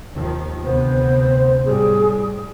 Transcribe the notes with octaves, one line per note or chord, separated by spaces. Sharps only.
D#2 D#3 F3
D2 C3 B3 C5
A2 G3 G#4